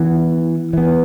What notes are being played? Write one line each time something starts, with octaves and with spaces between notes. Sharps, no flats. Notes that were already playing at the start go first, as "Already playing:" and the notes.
Already playing: E3 B3
E3 B3